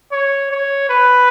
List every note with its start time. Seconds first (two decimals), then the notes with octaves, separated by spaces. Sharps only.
0.12 C#5
0.51 C#5
0.89 B4